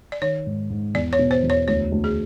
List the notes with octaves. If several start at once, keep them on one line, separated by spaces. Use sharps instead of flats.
D5
D#3 C#5
G#2
G#2
E2 D5
C#5
B2
C5
E2
C#5
D2 C#5
D2
G#4